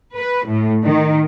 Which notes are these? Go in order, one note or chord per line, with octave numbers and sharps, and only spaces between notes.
B4
A2
D#3